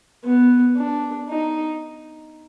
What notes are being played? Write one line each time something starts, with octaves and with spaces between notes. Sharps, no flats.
B3
D4
D#4